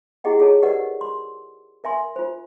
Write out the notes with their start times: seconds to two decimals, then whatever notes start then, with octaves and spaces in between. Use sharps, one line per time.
0.24 E4 G4 G#4 D#5 F#5 G5
0.39 F4 G#4 A4 C#5 A5
0.62 G4 A#4 B4 D5 D#5 F#5
1.01 C6
1.84 A#4 E5 G#5 C6
2.16 F4 C5